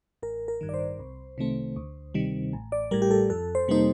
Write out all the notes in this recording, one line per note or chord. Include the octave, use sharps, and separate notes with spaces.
A1 A#4
A#4
G2 D#3
D5
C5
C2
C3 D#3 A3 C4
D2
C3 D#3 G3
A1
D5
A2 G3 A#4
G4
A4
F2 A4
C5
C3 G3 A#3 D#4 C5